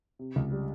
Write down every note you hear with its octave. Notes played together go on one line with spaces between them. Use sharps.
C3
C#2
G3